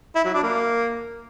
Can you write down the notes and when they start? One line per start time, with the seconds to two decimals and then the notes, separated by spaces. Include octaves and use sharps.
0.15 E4
0.25 F#3
0.34 D4
0.43 A#3